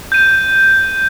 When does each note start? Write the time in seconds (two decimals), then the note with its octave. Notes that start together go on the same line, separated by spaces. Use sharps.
0.12 G6 D#7